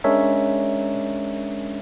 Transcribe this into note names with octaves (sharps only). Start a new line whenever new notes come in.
G#3 C#4 D4 A#4 C#5 E5